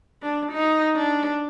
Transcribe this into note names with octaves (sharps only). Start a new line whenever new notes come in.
D4
D#4
D4